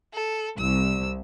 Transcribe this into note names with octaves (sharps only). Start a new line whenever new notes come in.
A4
C2 E6